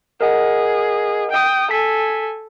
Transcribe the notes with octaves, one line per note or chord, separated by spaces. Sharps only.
G#4 A#4 D#5 F#5
G5 D#6
A4 G#5 B6